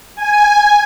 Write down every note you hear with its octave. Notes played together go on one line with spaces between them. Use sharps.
G#5